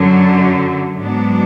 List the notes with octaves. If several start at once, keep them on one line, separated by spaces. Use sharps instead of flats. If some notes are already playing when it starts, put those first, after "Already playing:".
Already playing: F#2 D3 F#3
G#2 F#3 B3 D4